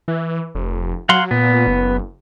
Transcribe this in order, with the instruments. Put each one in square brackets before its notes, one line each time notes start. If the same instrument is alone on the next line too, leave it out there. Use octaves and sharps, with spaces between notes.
[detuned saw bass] E3
F1
[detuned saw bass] F#3 [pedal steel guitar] F5 F#5 C6
[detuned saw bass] A#2 [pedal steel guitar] B3
[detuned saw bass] F#1